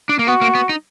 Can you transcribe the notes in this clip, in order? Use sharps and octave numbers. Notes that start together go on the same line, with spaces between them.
D4
A#3
B3 F#4
A#3
B3
D#4